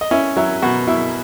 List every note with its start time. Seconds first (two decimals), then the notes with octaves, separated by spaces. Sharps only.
0.01 D#5
0.11 C#4 E4 E5
0.36 F#3 E4 E5
0.62 B2 F#4 F#5
0.87 B2 E4 E5